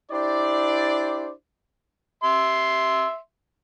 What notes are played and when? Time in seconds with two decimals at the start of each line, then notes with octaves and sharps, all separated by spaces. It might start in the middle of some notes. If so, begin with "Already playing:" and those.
0.11 D4 E4 G4 C5 D5
2.24 E5 C6